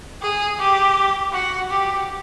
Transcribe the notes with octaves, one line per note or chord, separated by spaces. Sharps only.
G#4
G4
F#4
G4